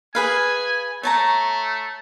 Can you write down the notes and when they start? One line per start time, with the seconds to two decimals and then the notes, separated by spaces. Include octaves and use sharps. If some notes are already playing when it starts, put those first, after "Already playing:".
0.15 G#4 B4 F5 G#5
1.03 A3 C#5 A5 A#5